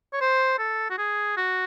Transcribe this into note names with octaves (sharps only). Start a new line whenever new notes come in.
C#5
C5
A4
F#4
G#4
F#4